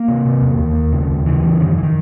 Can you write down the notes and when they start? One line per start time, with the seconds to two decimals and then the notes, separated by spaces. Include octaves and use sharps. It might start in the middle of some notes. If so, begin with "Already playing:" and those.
Already playing: A#3
0.08 C3
0.25 C3
0.42 E2
0.58 D#2
0.75 D#2
0.93 C#3
1.09 D#2
1.26 C#3 E3
1.43 C#3
1.60 F#2 D#3
1.77 E3
1.83 D#3